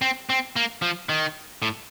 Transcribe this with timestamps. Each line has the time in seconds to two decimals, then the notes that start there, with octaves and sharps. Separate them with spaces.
0.02 C4
0.29 C4
0.56 A#3
0.82 F3
1.09 D#3
1.62 A2